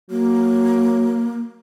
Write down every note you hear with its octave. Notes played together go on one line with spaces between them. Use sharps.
F#3 A#3